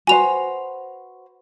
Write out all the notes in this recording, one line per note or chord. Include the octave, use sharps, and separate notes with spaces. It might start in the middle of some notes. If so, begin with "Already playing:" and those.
F#4 B4 C5 G#5 F7